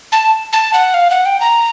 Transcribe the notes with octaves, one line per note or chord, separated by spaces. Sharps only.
A5
A5
F#5
F5
F#5
G5
A#5